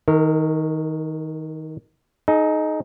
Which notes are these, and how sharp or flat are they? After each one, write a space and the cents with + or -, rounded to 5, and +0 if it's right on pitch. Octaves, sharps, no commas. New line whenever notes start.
D#3 +20 A#4 -30
D#4 +0 G#4 +45